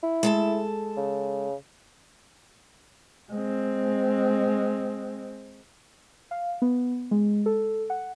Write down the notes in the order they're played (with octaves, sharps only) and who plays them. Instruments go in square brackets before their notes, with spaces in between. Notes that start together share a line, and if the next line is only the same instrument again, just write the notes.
[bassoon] E4
[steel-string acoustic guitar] G#3 A4 A5
[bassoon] C#3
[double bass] G#3 C4
[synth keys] F5
B3
G#3
A4
F#5